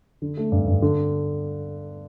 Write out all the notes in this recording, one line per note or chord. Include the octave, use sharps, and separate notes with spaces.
D3
A3
G2
G2
D3